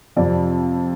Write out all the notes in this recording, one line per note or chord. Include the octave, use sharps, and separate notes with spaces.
F2 C3 F3 D5